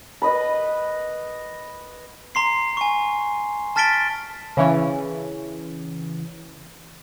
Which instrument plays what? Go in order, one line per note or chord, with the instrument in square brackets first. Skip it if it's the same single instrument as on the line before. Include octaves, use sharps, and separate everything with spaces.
[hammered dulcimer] B4 D#5 B5
[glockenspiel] A#5 C6 C7
G#5 C#6
A5 F6 A6 B6 D7 G7
[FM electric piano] C#3 E3 C#4